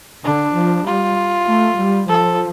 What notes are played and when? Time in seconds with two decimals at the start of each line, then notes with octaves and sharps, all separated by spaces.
0.24 D3 D4
0.55 F3
0.86 G3 F4
1.47 A3
1.78 G3
2.09 F3 A4